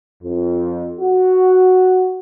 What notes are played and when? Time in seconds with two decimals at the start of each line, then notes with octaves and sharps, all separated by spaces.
0.23 F2
1.00 F#4